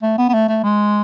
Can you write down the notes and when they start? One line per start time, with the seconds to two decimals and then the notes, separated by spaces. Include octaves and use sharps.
0.02 A3
0.18 B3
0.29 B3
0.33 A3
0.48 A3
0.63 G#3